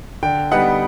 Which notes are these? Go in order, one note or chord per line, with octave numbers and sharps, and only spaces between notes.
D3 G5
G3 B3 D#4 F#5